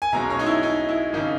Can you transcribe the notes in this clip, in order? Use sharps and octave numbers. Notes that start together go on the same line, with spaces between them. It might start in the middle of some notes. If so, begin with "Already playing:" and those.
G#5
B1 B2 G#3 C#4 A#5
C#5
D#4
E4
D#4
E4
G#1 C#3 D#4